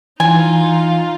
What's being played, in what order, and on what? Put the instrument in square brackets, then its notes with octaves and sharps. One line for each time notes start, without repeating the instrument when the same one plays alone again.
[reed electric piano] E3 [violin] D#4 F5 [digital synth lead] F4 [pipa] G#5